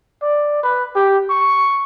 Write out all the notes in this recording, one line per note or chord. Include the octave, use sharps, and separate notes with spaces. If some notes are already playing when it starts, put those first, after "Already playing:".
D5
B4
G4
C#6